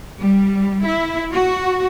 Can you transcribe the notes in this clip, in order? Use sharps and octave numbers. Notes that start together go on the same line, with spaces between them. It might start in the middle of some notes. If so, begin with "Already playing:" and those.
G3
E4
F#4